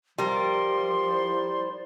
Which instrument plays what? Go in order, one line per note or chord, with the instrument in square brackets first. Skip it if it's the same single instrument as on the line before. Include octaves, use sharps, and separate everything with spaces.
[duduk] F3 [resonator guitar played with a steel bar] G3 A#4 [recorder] C6
[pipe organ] E4 C5 D5